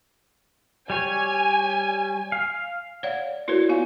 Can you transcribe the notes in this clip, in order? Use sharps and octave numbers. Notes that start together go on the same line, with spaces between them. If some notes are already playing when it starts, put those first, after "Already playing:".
G3 C#5 G#5
F5
C#5 D5 F5 F#5
E4 F#4 A#4 B4 C#5 D5
B3 F4 F5 G#5